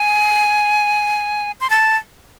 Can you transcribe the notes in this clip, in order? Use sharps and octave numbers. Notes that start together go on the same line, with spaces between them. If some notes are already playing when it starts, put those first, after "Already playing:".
Already playing: G#5
C6
A5